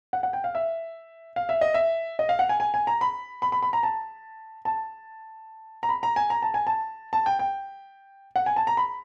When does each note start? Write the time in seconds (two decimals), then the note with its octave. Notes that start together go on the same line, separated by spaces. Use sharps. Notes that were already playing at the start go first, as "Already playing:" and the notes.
0.13 F#5
0.23 F#5
0.33 G5
0.44 F5
0.55 E5
1.36 F5
1.49 E5
1.61 D#5
1.74 E5
2.19 D#5
2.29 F5
2.39 F#5
2.49 G#5
2.60 G#5
2.74 G#5
2.87 A#5
3.01 B5
3.42 B5
3.52 B5
3.63 B5
3.73 A#5
3.83 A5
4.65 A5
5.83 A#5
5.89 B5
6.03 A#5
6.16 G#5
6.30 A#5
6.42 A5
6.54 G#5
6.67 A5
7.13 A5
7.26 G5
7.39 G5
8.36 F#5
8.46 G#5
8.56 A5
8.67 A#5
8.77 B5